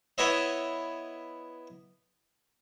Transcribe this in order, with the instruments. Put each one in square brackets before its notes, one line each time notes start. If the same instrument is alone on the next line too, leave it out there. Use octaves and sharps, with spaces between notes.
[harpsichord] B3 E4 C#5 D#5 E5